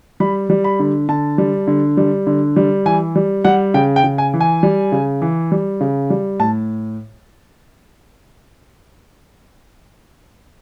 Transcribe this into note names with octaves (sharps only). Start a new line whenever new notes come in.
G3 B5
G3
B5
D3
D3 A5
G3
D3
G3
D3
G3
E3 G#5
G3
G3 F#5
C#3 G5
G5
C#3
G#5
E3
G#5
G3
C#3
E3
G3
C#3
G3
A2 A5